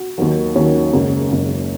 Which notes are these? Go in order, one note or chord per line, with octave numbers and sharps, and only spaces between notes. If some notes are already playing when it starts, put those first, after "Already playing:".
Already playing: F#4
D#2 D#3 F#3
D#2 D#3 F#3 C#4
F#1 F#2 C#3 G#3
F#1 F#2 C#3 G#3